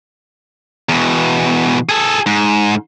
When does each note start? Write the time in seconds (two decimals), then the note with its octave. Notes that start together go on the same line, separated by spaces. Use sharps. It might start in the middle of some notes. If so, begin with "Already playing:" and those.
0.89 E2 B2
1.89 G#4 A4
2.26 G#2